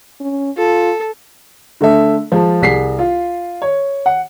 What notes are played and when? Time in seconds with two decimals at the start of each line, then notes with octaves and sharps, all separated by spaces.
0.20 C#4
0.57 F4 A4
1.81 D3 A3 A4 E5
2.32 F3 G#3 A5
2.62 C2 G#4 B6 C7
2.99 F4
3.62 C#5
4.06 F#5